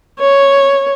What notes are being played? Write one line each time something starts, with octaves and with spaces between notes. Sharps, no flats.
C#5